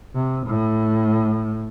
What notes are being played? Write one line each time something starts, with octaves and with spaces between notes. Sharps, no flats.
C3
A2